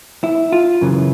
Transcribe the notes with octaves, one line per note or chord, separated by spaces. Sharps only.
E4
F4
F#2 C#3 E3